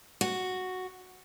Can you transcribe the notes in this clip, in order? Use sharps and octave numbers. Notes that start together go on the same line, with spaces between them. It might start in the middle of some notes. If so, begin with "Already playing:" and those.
F#4